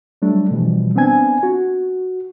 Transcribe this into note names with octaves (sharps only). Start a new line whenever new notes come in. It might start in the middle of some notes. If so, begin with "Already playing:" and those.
F#3 G3 A3 D4
B2 E3 F3 G3
B3 C4 D4 G#5 G#6
F#4